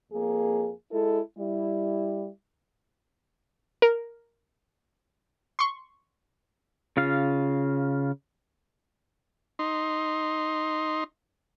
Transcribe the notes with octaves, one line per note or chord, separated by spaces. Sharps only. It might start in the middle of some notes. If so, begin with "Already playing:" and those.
F2 A#3 G#4
G#3 E4 A4
G3 E4
A#4
C6 C#6
C#3 F4 F5
D#4 C6